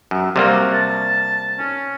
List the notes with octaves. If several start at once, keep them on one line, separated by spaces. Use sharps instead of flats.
F#2
C3 G3 A#3 F#4
A5
C#4